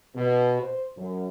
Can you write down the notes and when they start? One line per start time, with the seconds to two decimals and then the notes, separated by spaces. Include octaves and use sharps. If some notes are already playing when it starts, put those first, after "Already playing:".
0.15 B2
0.62 C5
0.97 F#2